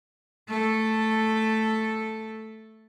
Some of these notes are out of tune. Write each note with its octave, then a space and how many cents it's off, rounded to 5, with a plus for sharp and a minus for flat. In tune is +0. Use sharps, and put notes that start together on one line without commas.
A3 +0 A4 +0